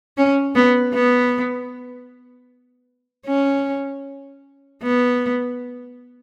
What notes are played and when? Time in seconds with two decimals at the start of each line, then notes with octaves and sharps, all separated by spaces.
0.17 C#4
0.55 B3
0.94 B3
3.27 C#4
4.83 B3